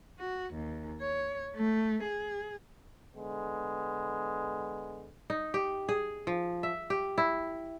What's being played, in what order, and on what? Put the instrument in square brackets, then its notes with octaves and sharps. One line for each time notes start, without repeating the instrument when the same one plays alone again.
[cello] F#4
D#2
C#5
A3
G#4
[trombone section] D3 G#3 B3
[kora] D#4
G4
G#4
F3
E5
G4
E4